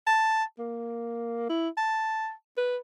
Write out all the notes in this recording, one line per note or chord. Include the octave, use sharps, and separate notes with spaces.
A5
A#3
E4
A5
B4